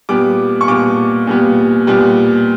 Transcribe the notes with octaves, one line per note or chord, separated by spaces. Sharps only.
A#2 G3 B3 D6
C#6
A#2 G3 B3 D6
A#2 G3 B3
A#2 G3 B3